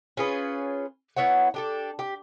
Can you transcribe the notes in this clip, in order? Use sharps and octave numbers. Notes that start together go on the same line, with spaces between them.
C#4 F4 G#4 B4
B3 E4 C#5 F#5
D4 G4 A4
G4